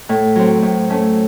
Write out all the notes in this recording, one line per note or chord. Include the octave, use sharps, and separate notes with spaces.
A2
F#3 C4
A2
A3 C#4